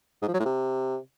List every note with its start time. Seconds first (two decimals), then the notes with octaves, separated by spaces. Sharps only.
0.22 G#2
0.28 F3
0.34 F#3
0.40 A2
0.45 C3